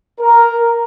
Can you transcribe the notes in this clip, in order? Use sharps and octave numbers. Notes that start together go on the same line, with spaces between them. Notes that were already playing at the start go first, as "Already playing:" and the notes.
A#4